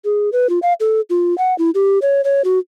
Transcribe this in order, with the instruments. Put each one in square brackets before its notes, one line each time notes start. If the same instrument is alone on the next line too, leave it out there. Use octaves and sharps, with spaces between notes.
[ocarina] G#4
B4
F4
F5
A4
F4
F#5
E4
G4
C#5
C#5
F#4